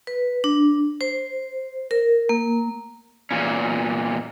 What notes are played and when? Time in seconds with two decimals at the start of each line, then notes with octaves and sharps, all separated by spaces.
0.07 B4
0.44 D4
1.01 C5
1.91 A#4
2.29 A#3
3.31 E2 G2 A#2 C#4